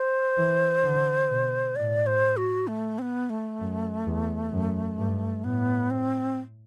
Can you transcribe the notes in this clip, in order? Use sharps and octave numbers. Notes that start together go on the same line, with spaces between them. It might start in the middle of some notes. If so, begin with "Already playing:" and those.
Already playing: C5
E3
D3
B2
A2 D5
C5
F#4
A3
C4
B3
A3
F#2
E2
F#2
G2
A2 B3
C4